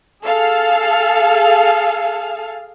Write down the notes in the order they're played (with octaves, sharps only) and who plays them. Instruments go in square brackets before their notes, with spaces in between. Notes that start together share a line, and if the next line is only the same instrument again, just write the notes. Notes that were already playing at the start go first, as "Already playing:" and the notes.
[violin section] G#4 A4 F5